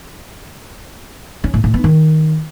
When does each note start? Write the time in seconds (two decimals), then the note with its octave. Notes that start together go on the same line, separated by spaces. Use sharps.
1.44 C#4
1.54 A2
1.64 A2
1.74 B3
1.84 D#3